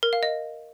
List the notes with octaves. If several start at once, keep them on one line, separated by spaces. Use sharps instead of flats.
A#4
F5
D#5